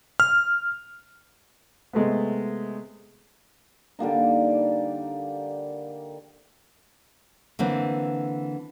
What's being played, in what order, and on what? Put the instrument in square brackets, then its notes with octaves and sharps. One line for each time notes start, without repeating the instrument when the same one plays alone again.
[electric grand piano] F6
[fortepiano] C3 G#3 A3 B3
[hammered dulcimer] D3 G3 A#3 D#4
[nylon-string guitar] D3 E3 A#3 C4